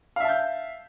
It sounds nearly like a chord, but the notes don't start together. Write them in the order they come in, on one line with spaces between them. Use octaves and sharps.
F5 E5 A5 G6